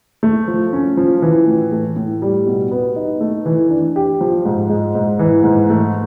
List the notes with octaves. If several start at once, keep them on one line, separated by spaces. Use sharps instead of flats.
A3
F3
C#4
F3
E3
A2
A3
A2
G3
B2
B3
D#4
A3
E3
D4
G4
F3
G#2
G#3
G#2
E3
G#2
A3